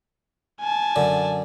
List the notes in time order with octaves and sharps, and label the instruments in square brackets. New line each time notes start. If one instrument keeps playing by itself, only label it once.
[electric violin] G#5 A5
[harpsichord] F#2 D3